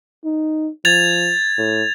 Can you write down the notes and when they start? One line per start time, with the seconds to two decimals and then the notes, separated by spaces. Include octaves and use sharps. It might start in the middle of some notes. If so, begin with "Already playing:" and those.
0.25 D#4
0.85 F3 G#6 A6 F7
1.58 A2